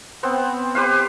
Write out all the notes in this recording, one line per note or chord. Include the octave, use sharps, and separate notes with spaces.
B3 C4
G4 B4 C5 F5